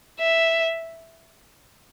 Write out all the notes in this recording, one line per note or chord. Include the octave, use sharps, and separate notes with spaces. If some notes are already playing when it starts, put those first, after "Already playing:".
E5